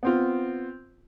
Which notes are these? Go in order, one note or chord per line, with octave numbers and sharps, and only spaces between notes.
B3 C4 F4